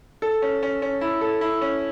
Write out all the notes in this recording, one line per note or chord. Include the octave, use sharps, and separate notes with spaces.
A4
C#4
C#4
C#4
E4
A4
E4
C#4